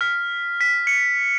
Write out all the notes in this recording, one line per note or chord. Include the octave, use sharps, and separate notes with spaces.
F6 B6
B6
C#7